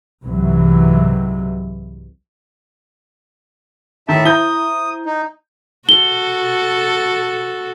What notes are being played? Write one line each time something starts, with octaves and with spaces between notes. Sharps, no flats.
C2 G#2 C3 E3 F#3
A2 D#3 E5 A5
E4 C5 A#5 D#6 G6 G7
D#4
F#4 A4 G7